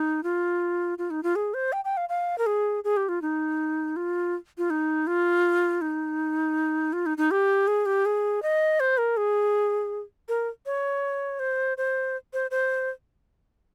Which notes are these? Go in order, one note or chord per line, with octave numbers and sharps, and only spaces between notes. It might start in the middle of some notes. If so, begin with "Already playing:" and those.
Already playing: D#4
F4
F4
D#4
F4
G#4
C5
G5
G5
F5
F5
A#4
G#4
G#4
G4
F4
D#4
F4
F4
D#4
F4
D#4
F4
D#4
D#4
G4
G#4
G4
G#4
D#5
C5
A#4
G#4
A#4
C#5
C5
C5
C5
C5